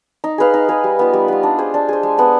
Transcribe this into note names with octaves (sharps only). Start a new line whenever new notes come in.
D#4
G#4 B4 F5
D#4
G#4 B4 F5
G3
B3 F4
G3
B3 F4
D4
G#4 C5
D4
G#4 C5
G#3
B3 D4